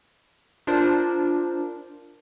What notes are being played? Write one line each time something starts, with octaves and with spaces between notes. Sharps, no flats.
D4 F4 A#4 C5 D5